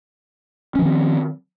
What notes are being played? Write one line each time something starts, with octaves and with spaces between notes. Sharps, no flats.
D#3 F3 C4 C#4